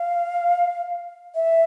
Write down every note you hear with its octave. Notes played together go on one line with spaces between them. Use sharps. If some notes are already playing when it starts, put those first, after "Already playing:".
Already playing: F5
E5